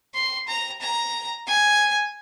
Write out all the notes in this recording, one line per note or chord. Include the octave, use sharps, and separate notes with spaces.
C6
A#5
A#5
G#5